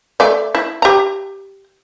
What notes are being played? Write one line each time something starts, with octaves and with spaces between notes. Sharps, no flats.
A3 D5
E4
G4 A#5